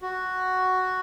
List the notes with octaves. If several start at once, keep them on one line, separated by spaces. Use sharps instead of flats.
F#4